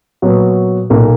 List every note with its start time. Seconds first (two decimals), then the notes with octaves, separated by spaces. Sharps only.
0.22 A#2 F#3 B3 F#4 C#5
0.90 B1 A#2 A#3